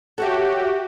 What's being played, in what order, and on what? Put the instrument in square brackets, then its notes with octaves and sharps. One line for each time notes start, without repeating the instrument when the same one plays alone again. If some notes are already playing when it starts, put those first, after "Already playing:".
[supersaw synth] F#4 G4 [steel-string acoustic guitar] A4 C#5 E5